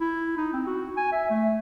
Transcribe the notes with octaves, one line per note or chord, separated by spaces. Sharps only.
E4
D#4
C4
F#4
G#5
E5
A3